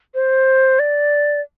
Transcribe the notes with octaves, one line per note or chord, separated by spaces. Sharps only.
C5
D5